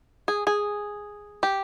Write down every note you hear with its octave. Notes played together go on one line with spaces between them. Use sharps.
G#4
G#4
G4